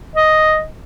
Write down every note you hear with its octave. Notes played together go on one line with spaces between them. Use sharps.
D#5